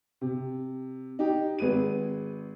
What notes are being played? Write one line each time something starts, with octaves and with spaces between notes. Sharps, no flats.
C3
D#4 G4
G#1 G#4 B4 D#7